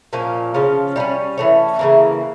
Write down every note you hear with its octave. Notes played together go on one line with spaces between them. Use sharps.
A#2 F3 A#3 C#4
C#3 F3 C#4 F4
G3 A#3 C#4
E3 A3 C#4
C#3 E3 A#3